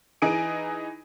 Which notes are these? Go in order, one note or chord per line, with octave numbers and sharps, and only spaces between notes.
E3 D#4 G#4 G#5 D7